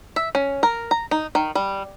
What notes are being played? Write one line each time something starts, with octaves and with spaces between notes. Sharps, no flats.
E5
C#4
A#4
A#5
D#4
D#3
G3